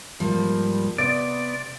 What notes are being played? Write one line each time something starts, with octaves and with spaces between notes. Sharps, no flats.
G#2 F3 G3 A#3
C3 B3 D5